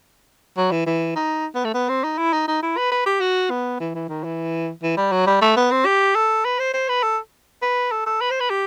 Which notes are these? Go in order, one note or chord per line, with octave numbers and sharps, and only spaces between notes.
F#3
E3
E3
D#4
B3
A3
B3
C4
D#4
E4
D#4
D#4
E4
B4
B4
G4
F#4
B3
E3
E3
D#3
E3
E3
G3
F#3
G3
A3
B3
C4
G4
A4
B4
C5
C5
B4
A4
B4
A4
A4
B4
C5
B4
G4